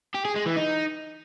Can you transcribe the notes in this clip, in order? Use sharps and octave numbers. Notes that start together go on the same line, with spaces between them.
G4
G#4
G#3
E3
D#4